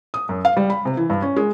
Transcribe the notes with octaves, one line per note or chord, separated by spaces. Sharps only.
D#6
F#2
F5
G3
B5
C3
E3
G2
C#4
G#3